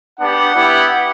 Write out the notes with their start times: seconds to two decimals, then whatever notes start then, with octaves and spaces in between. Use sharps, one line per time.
0.19 B3 D4 G4 F#5
0.55 B3 E4 G4